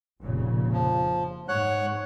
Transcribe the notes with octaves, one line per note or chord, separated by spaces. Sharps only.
F1 A#2 C#3
F3
G#2 C#5 F#5 F#6